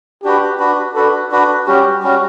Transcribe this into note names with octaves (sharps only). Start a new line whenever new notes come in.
D4 F#4 G4 B4
D4 F#4 B4
D4 F#4 A4 B4
D4 F#4 B4
G3 C#4 F#4 G4
G3 C#4 F#4